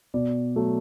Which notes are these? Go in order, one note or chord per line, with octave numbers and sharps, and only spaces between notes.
B2 D5
F#3 A3